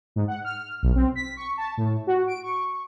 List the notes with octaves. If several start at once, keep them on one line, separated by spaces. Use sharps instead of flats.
G#2
F#5
F6
B1
C4
B6
C#6
A5
A2
F#4
D7
C#6